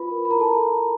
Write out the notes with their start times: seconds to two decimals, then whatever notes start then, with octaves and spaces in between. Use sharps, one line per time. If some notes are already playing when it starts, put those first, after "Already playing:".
Already playing: F4 B4 B5
0.11 A#4
0.25 B5
0.30 E4 A#4 A#5
0.40 A4 A5